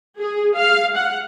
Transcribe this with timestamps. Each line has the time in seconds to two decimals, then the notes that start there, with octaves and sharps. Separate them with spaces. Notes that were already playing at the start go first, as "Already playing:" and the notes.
0.20 G#4
0.57 F5
0.97 F#5